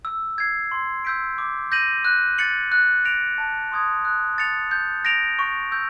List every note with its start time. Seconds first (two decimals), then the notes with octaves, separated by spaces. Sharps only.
0.05 E6
0.38 G#6 C7
0.71 C6
1.05 E6 G6 B6 D7
1.38 D6
1.72 G6 A#6 D#7 F#7
2.05 F#6
2.38 A6 C#7 F#7
2.72 F#6
3.05 A#6 D7 F7
3.38 A5
3.72 C6 D#6 G#6
4.05 F#6
4.38 A6 C#7 F7
4.71 G6
5.05 A#6 D7 F7
5.39 C#6
5.72 E6 G6